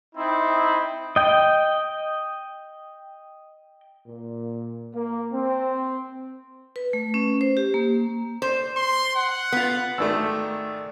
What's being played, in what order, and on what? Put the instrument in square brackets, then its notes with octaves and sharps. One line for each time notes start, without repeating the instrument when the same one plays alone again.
[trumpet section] C4 D#4 E4
[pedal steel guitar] D#5 G5
[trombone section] A#2
A#3
C4
[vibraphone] B4
A3
C#4
C5
G4
A#3
[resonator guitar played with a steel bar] C5
[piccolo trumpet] C6
F#5
[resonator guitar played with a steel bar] B3 F4
[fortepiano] G#1 D#3 A3 [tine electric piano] D5 E6